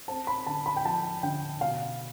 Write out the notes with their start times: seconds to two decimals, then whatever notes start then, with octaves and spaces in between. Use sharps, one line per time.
0.08 C4 A5
0.27 B5
0.47 D3 A5
0.66 B5
0.76 G5
0.85 F3 A5
1.23 D3 G5
1.61 B2 F5